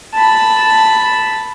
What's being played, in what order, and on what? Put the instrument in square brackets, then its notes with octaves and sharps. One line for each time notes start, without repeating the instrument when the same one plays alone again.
[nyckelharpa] A5 B5